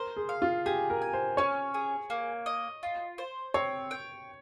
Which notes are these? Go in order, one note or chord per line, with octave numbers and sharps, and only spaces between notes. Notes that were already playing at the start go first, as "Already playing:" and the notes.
Already playing: A#4 C5
G#4
F5
F4
G4 G#4
A#4
G#5
C5
C#4 C#5
G#4
A#3
D#5
F4
C5
C4 C#5
G5